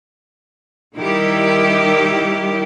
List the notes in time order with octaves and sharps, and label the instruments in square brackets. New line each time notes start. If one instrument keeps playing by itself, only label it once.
[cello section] D#3 G3 E4 G4